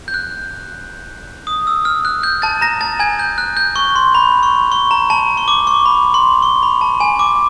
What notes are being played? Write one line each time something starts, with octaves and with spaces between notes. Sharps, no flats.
G6
F#6
D#6
E6
F6
F#6
G6
A5 A6
A#5 A#6
A5 A6
G#5 G#6
G6
F#6
G6
C#6
C6
B5
C#6
C#6
A#5
A5
C#6
D6
C#6
B5
C6
C#6
B5
A5
G#5
D6